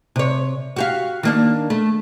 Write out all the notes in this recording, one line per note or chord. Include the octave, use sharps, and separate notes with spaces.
C3 C#5
F#4 G4 F5
D#3 A#3 D4
A3